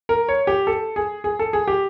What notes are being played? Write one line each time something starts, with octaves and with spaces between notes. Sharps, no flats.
A#4
C#5
G4
A4
G#4
G#4
A4
G#4
G4